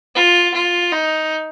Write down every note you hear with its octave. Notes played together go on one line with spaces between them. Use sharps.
F4
F4
D#4